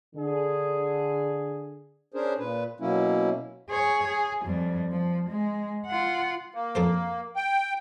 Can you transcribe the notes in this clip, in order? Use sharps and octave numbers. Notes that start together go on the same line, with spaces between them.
D3 G#4
C#4 D4 G#4 A#4 C5
A#2 B4
B2 F#3 A#3 C#4 E4
G#4 C#5
G#4
F2 G3
F3
G#3
F4 F#5
A#3
F2 A4 C5
G5